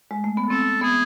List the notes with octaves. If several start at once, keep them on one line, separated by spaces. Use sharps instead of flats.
G#3
A3
B3
C4 A4
B3 G#4